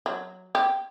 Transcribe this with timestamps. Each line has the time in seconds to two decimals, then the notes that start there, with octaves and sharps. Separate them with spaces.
0.06 F#3
0.55 G4